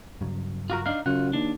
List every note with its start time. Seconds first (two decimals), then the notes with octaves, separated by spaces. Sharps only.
0.21 G2 C#3 F#3
0.70 F4 F#4 A#4
0.86 D4 D#4 F5
1.06 F#2 C#3 F4 F#5
1.33 D#2 D4